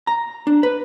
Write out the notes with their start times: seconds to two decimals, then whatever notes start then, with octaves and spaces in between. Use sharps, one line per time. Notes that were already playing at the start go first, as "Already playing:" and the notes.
0.07 A#5
0.47 D4
0.63 B4